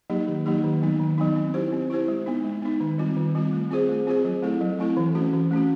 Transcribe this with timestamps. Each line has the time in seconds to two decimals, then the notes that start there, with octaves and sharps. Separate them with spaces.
0.10 F#3 A#3 D#4 G4
0.28 D#3
0.46 F#3 A#3 D#4 G4
0.64 D#3
0.82 F#3 B3 D#4
1.00 D#3
1.18 F#3 B3 D#4
1.36 C4
1.54 E4 G4 C5
1.72 C4
1.90 E4 G4 C5
2.08 G#3
2.26 B3 D#4
2.44 G#3
2.62 B3 D#4
2.80 D#3
2.98 G3 C4 F4
3.16 D#3
3.35 G3 C4 F4
3.52 A3
3.71 C4 F4 G#4 C5
3.89 A3
4.07 C4 F4 G#4 C5
4.25 F#3
4.43 A3 C4 E4 A4
4.61 F#3
4.79 A3 C4 E4 A4
4.97 E3
5.15 A3 C#4 F#4
5.33 E3
5.51 A3 C#4 F#4